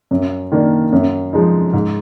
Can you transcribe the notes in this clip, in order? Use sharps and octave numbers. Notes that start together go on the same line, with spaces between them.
F#2
D#3 A#3 D4
F#2
F3 G#3 D#4
G#2